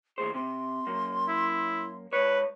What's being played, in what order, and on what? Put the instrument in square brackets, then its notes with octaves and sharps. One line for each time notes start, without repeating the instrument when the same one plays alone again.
[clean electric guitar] D#2 A2 C5 [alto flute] G#4
[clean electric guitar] C3 [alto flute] C6
[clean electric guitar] F#2 A#3
[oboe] E4
[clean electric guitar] G#2 C#5 [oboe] B4